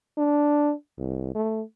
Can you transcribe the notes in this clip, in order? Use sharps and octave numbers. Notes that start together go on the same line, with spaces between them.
D4
C2
A3